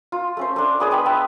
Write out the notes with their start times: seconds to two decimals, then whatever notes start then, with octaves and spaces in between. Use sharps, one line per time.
0.12 F4
0.37 A3 C#4 C5
0.56 A3 D4
0.80 B3 G#4 D5
0.91 B4 D#5 G5 B5
1.06 B4 E5 G5 A5